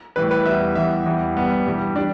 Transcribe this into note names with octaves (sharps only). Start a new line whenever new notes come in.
A2 E3 G3 B4
B4
E2 E3 G3 E5
E2 E3 G3 E5
E2 E3 G3
G2 G3 B3
G2 E3 G3
G3 D4